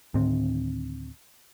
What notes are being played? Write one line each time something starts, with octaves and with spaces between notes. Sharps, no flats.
D2 A2 D#3 C4